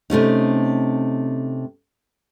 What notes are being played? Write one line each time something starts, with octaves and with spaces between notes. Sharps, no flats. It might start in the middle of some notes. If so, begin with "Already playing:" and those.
C3 A3 C#4 D#4